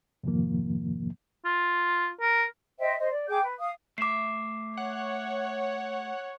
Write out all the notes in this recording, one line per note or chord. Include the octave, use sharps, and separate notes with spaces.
F2 G#2 C3 D#3 F3 A#3
F4
A#4
C5 D#5 E5 G5
C5 D#5
D5
G#4 G5 D6 G6
B4
F5 D#6
A3 E5 D6 C7
C#5 F#5